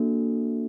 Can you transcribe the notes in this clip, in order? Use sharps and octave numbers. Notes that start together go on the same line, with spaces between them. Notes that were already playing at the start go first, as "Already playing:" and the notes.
Already playing: A#3 D4 F#4 A4